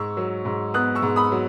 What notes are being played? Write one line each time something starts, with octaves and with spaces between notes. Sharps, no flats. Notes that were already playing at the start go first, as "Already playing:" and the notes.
Already playing: G#2 C#6 E6
F#3
G#2
B3 D#6 F#6
C#6 E6
G#2
B5 D#6
F#3